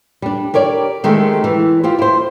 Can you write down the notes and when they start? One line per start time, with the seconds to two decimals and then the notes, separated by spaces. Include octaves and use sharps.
0.22 G3 D4
0.54 G4 A#4 C#5 D5
1.04 D#3 G#3 A3 C4 G4
1.44 E3
1.83 F4 G4 C5
1.99 E4 C5